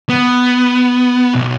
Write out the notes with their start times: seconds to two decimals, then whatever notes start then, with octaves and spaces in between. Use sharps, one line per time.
0.09 B3
1.34 B1